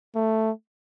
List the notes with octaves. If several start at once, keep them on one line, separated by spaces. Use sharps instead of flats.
A3